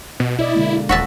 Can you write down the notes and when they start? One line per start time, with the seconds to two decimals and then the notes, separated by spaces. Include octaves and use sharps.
0.20 B2
0.39 B2 E4 D5 D#5
0.55 D3 G#3 A#3
0.89 D#1 F#4 E5 A5